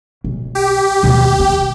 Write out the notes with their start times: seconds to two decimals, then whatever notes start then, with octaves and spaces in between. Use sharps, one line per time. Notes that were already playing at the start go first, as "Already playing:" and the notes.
0.24 B1
0.55 G4
1.03 D#2 B2
1.40 C4